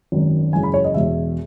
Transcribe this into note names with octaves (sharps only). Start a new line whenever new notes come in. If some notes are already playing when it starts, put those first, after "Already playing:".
G#1 F#2 D#3 F#3
F#1 F#2 E3 G#3 G#5
B5
C#5
D#5
E1 E2 B2 E5